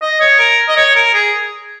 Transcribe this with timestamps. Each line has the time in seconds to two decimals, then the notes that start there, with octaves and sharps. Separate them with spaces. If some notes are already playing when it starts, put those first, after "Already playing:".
0.02 D#5
0.20 C#5
0.39 A#4
0.68 D#5
0.77 C#5
0.96 A#4
1.14 G#4